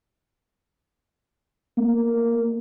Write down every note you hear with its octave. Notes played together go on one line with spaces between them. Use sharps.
A#3